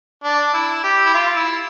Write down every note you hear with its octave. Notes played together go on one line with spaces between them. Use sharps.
D4
E4
G4
E4
F4
E4